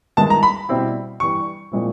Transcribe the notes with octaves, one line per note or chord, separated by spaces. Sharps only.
G2 D#3 G#3 B3 E4 A5
A#5
B5
B2 G3 C4 E4
G2 E3 G3 C#6
A#2 F3 G#3 C4 E4